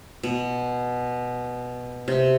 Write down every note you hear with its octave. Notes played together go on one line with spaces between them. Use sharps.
B2
C3